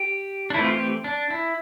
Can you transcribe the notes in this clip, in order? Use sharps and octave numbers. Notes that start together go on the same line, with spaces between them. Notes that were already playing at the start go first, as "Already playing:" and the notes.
Already playing: G4
D4
E3 A3 C4 E4
F4
G4
D4
E4